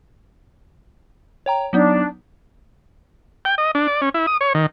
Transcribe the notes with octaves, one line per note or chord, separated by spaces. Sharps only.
C#5 G5 A#5
F#3 B3 D4 D#4
G5
D#5
D4
D5
C#4
E4
D#6
C#5
D#3